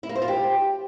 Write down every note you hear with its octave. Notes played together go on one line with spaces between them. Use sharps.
E4
A#3
C5
F4
G4